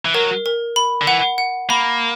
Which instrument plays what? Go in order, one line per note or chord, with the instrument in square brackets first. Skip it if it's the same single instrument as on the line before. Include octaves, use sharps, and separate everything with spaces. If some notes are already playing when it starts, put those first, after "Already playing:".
[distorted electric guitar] E3
[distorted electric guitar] F#3 [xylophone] A#4
[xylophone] A#4
B5
[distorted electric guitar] D3
[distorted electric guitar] E3 [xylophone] F#5
[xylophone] F#5
[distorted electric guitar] A#3 [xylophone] B5